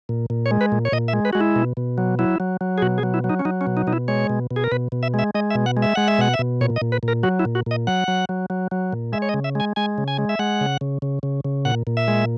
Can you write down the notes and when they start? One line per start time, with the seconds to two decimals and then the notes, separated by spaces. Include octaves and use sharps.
0.09 A#2
0.30 A#2
0.46 C#5
0.51 G#3
0.61 B4
0.72 A#2
0.85 C#5
0.92 A#2 D#5
1.08 E5
1.13 G#3
1.25 B4
1.33 G#3 F#4
1.41 E4
1.56 B2
1.77 B2
1.98 F#3
2.19 F#3 E4
2.40 F#3
2.61 F#3
2.78 G#4
2.82 B2 F#4
2.98 G#4
3.03 F#3
3.14 E4
3.24 F#3
3.30 D#4
3.39 C#4
3.45 F#3 D#4
3.61 C#4
3.67 B2
3.77 D#4
3.87 B2 D#4
3.93 E4
4.08 G#3 C#5
4.29 B2
4.51 B2
4.56 G#4
4.64 A#4
4.72 B2 B4
4.92 B2
5.03 E5
5.14 G#3 E5
5.35 G#3 D#5
5.51 E5
5.55 B2
5.66 F#5
5.77 G#3
5.82 E5
5.95 G#3 F#5
6.08 E5
6.19 B2 F#5
6.34 E5
6.39 B2
6.61 A#2 C#5
6.76 D#5
6.82 A#2
6.92 B4
7.03 A#2
7.08 A#4
7.23 F#3 F#4
7.39 E4
7.45 A#2
7.55 F#4
7.66 A#2 D#5
7.87 F#3 F#5
8.08 F#3
8.29 F#3
8.50 F#3
8.71 F#3
8.92 A#2
9.13 G#3 E5
9.22 C#5
9.29 D#5
9.34 C#3
9.44 E5
9.55 G#3 G#5
9.76 G#3 G#5
9.98 C#3
10.08 G#5
10.18 G#3
10.29 E5
10.39 G#3 F#5
10.61 C#3
10.81 C#3
11.02 C#3
11.23 C#3
11.45 C#3
11.65 A#2 F#5
11.87 A#2
11.97 E5
12.08 G#3